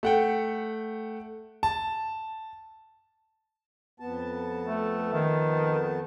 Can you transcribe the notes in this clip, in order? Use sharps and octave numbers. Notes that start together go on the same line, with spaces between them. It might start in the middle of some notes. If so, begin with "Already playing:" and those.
A3 F#5 G5
A5
F2 B3 A5
A3
D#3